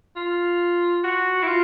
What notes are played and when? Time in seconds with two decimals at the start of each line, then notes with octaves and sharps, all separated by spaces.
0.16 F4
1.04 F#4
1.43 E4
1.47 F4